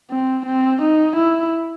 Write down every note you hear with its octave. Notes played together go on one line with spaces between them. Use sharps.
C4
C4
D#4
E4